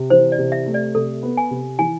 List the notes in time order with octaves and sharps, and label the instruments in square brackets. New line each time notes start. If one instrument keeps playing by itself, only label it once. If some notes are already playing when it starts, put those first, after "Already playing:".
Already playing: [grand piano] C3
[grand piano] E3 [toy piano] C5
[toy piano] D5
[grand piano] C3
[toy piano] E5
[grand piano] A3
[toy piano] D5
[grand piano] C3 [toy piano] A4
[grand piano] B3
[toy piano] G#5
[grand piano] C3
[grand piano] E3 [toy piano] G#5